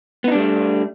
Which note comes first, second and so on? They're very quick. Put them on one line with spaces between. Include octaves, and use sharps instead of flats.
B3 D#4 D4 G3 A3